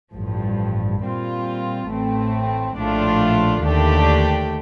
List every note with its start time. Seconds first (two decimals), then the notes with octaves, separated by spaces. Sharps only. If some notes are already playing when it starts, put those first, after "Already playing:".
0.13 A1 G2 F3
1.01 A#2 G3 C4 F4
1.88 A1 A2 A3 C4
2.75 A#1 A2 A3 D4 F4
3.63 D#2 D3 A3 D4 G4